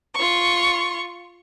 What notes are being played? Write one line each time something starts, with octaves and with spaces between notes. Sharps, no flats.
F4 C#6